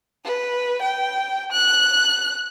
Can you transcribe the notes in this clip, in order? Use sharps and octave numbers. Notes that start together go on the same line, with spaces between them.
B4
G5
F#6